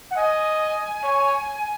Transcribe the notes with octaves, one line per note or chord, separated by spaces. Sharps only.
F#5
D#5 G#5
C#5